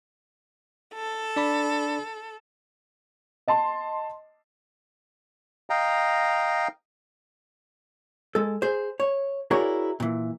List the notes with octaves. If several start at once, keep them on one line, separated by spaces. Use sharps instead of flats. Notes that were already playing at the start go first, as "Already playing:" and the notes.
A4
D4 D5 B5
D#5 A5 C6
D#5 F5 G5 A#5
G#3 A4
G#4 C5
C#5
E4 F#4 G#4 A#4 C#5 D5
A#2 E3